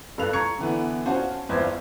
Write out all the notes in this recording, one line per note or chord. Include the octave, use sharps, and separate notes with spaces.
G2 A4 F5 F#6 F7
A#5 C#6 G#6 C#7
D3 E3 B3
C#4 F#4 C5 F5 A5
G1 E2 C4 C5 G#6
F5